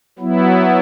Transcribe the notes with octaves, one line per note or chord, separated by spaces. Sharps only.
F#3 B3 E4